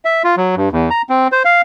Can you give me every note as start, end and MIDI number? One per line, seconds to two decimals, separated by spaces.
0.05 0.23 76
0.24 0.35 65
0.37 0.55 54
0.56 0.69 43
0.72 0.90 40
0.90 1.02 82
1.10 1.28 60
1.32 1.43 72
1.45 1.61 77